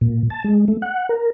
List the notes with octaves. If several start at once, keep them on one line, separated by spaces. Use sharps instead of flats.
A#2
A5
G#3
A3
F#5
A#4